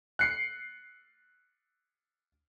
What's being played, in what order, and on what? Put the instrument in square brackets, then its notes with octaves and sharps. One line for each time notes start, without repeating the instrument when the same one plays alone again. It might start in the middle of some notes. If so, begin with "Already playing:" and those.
[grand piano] F#6 C7 C#7